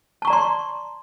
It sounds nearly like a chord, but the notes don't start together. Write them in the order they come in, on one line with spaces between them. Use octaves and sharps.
A5 C#6 A#5 D5 C6